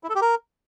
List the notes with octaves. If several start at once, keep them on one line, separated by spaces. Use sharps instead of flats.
E4
A4
G4
A#4